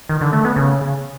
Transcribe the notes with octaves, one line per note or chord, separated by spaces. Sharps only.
D#3
D3
A3
B3
C#3